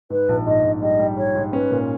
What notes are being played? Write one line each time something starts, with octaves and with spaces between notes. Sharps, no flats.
G#2 B4
A#1
G#2 D#5
A#1
G3 D#5
G3
G3 C#5
G#2
C#4 B4
A#2